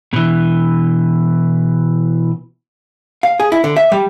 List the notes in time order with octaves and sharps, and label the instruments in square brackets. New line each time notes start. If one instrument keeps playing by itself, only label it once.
[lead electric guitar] B2 E3
[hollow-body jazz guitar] F5
G#4
E4
D3
E5
G3